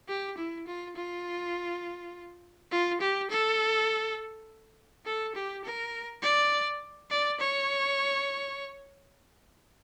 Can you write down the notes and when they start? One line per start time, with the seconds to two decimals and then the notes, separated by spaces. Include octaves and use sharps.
0.09 G4
0.37 E4
0.67 F4
0.96 F4
2.71 F4
3.01 G4
3.30 A4
5.05 A4
5.35 G4
5.64 A#4
6.22 D5
7.10 D5
7.40 C#5